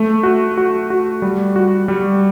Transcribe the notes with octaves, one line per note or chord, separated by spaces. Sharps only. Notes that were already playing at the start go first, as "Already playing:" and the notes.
Already playing: A3
F#4
F#4
F#4
G3
F#4
G3